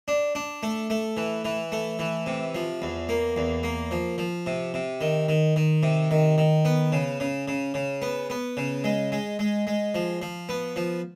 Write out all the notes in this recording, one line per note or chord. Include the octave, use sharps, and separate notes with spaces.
D4
D4
A3
A3
E3
E3
A3
E3
C3
F3
E2
A#3
E2
A#3
F3
F3
C3
C3
D#3
D#3
D#3
C3
D#3
D#3
B3
C#3
C#3
C#3
C#3
B3
B3
C#3
G#3
G#3
G#3
G#3
F3
F3
B3
F3